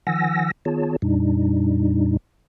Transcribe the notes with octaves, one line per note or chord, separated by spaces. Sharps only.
D#3 F3 F#5 G#5 E6 A#6
D#3 B3 F4 G#4 C#5 A5
F2 A#2 G3 D4 D#4